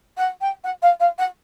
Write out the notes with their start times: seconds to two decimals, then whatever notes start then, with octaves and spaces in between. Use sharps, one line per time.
0.17 F#5
0.41 G5
0.64 F#5
0.82 F5
1.00 F5
1.18 F#5